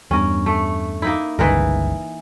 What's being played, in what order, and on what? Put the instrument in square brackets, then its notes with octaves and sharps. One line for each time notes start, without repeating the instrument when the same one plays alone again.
[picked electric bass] E2 G2 [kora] C#4 A#4
[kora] A3
A#3 D#4 E4
[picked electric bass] G1 C#2 C#3 [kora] E3 D#4 A#4